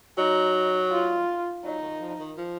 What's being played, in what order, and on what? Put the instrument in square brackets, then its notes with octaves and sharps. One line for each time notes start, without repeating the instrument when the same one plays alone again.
[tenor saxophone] F#3 [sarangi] D#4
[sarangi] F4
[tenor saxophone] F#3 [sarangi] D#4
[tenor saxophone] D#3
F3
D#3
F3